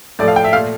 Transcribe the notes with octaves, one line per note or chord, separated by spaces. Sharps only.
A2 F3 A3 D5
F5
G5
E5
A#2 A3 F5